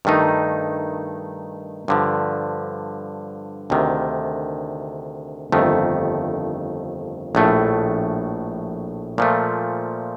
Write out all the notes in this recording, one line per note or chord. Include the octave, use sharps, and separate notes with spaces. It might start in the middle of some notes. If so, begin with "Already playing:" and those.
G2 D#3 A3 D#4
G2 D3 F3
D2 C3 D#3
G1 F2 D#3 A3
A#1 A2 A3
A#2 F3 A3